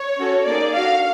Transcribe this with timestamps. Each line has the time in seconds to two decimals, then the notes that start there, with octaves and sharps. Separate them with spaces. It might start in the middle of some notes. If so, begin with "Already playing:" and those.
Already playing: C#5
0.18 C#4 F#4 A4
0.46 A#3 D#4 G#4 D5
0.75 D4 F#4 A4 F5